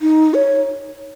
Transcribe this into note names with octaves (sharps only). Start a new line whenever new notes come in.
D#4
C#5